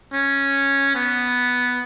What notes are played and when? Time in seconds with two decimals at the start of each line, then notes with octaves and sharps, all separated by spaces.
0.14 C#4
0.95 B3